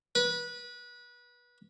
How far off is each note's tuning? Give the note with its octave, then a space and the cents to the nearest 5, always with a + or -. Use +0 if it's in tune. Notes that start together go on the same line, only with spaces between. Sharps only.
B4 -25